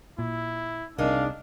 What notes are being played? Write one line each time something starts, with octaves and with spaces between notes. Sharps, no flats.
A#2 E4
C2 C3 D4 D#4 G#4 A#4 F5